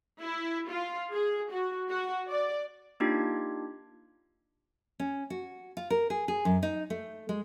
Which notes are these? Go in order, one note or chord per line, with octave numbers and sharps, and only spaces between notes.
E4
F4
G#4
F#4
F#4
D5
A#3 D4 D#4 F4 G4 G#6
C#4
F#4
F4
A#4
G#4
G#4
F#2
D#4
A3
G#3